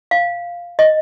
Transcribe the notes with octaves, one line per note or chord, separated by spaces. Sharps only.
F5
D#5